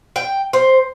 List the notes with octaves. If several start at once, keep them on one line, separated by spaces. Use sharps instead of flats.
G5
C5